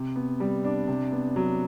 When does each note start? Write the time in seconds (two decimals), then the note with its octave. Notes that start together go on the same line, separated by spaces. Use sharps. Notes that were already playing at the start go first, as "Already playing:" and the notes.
Already playing: C3
0.16 B3
0.40 G3
0.64 D4
0.88 C3
1.12 B3
1.36 F#3